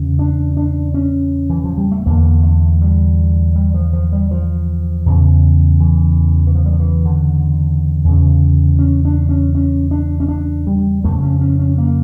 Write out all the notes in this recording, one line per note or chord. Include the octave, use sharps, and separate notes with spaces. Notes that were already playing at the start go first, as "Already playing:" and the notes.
Already playing: E2 C#3
D4
D4
C#4
E3
F3
G3
A3
E2 D3 A#3
A3
G3
G3
F3
F3
G3
F3
E2 C#3
E3
E3
F3
G3
F3
E3
D3
E2 C#3
C#4
D4
C#4
C#4
D4
C#4
D4
G3
F2 C#3 A3
C#4
C#4
C#4
A#3